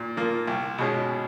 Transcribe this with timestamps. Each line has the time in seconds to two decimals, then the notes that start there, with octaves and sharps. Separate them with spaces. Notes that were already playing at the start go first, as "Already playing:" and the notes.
Already playing: A#2
0.17 F3 A#3
0.47 C2
0.78 B2 G#3 C#4